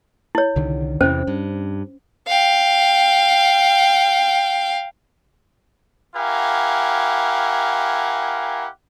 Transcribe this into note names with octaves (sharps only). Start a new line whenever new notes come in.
E4 C#5
C2 D3 D#3
E2 C3 E3 C#4 C5
G2
F5 G5
E4 G4 A#4 F5 F#5 G#5